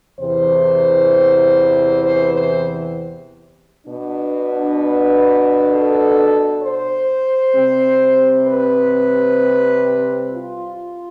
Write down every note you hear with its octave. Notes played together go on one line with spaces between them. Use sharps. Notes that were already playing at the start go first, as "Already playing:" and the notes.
E2 C3 E3 C5
C5
C5
B2 B3 D4
B4
A4
C5
C3 G3 C4
B4
F4